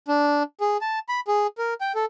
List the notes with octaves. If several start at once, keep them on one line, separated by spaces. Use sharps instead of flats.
D4
G#4
A5
B5
G#4
A#4
G5
A4